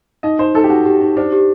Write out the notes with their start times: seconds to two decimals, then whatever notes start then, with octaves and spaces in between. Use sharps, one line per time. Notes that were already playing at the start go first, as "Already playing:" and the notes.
0.23 D#4 D#5
0.39 D#4 C5
0.55 D#4 A4
0.64 G4
0.70 D#4 F#4
0.86 G4
1.01 D#4
1.16 D4 C5
1.32 G4